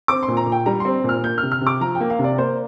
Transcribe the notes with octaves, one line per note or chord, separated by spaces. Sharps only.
C4 D6
C6
A#2
A#5
A#2
G5
G3 A#5
C4 C6
A#2 F6
A#3 G6
F6
C3
F6
C3
D6
F3 A#5
G5
A#3
F5
C3
D5
A#3 C5